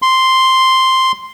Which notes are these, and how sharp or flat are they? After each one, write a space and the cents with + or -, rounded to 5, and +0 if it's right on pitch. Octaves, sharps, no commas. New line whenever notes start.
C6 +0